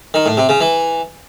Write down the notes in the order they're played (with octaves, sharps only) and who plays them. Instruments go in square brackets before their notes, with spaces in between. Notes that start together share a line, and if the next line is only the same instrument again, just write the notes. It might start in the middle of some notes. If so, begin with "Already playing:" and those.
[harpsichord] D#3
A2
C3
C#3
E3